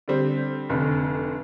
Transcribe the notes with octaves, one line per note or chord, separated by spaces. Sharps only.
D3 G3 C4
F1 F2 D3